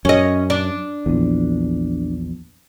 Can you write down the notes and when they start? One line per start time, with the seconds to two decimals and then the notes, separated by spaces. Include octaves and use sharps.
0.05 F#2 C#4 D#5
0.50 D4
1.06 A#1 E2